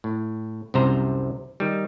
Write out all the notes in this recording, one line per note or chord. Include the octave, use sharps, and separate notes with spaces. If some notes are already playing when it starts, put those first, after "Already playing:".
A2
C2 F#2 C3 C5 A#5
D#3 G3